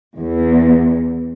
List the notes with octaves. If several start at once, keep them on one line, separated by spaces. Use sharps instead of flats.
E2